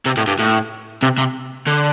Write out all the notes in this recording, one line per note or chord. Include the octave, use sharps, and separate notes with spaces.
C3
A2
G2
A2
C3
C3
D3